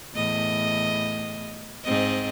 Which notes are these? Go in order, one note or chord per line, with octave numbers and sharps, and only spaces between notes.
E2 A2 D#5
G#2 C4 D#5